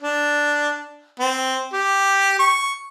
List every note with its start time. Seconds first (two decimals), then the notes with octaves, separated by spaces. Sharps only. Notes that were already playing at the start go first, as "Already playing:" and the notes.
0.01 D4
1.20 C4
1.73 G4
2.39 C#6